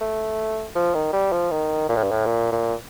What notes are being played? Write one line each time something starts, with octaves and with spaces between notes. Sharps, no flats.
A3
F3
D#3
G3
F3
D#3
A#2
A2
G2
A2
A#2
A#2